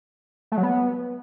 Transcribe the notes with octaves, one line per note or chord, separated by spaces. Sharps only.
A3
F#3
B3